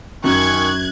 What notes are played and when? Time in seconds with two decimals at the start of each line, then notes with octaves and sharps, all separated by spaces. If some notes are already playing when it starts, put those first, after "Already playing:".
0.24 F#2 D#3 C#4 C#6 F#6 G#6